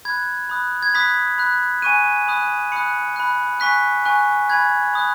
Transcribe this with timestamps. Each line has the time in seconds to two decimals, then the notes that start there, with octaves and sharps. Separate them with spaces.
0.05 B5 F#6 G#6
0.49 B5 D#6 F#6
0.83 G#6
0.94 B5 D#6 F#6 B6
1.38 B5 F#6
1.82 G#5 C#6 F#6 D#7
2.28 B5 D#6 F#6
2.72 B5 D#6 F#6 C#7
3.16 B5 F#6
3.60 G#5 C#6 F#6 B6
4.05 G#5 C#6 F#6
4.49 G#5 B5 F#6 G#6
4.94 B5 D#6 F#6